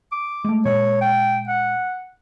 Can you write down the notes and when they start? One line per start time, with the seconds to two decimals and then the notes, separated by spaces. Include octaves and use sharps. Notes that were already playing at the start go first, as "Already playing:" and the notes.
0.12 D6
0.44 G#3 A3
0.65 A#2 G#3 C#5
1.01 G5
1.47 F#5